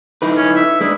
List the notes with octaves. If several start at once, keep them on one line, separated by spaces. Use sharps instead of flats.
D#4 E4 B4
C#4
E5
G#3 D4 E4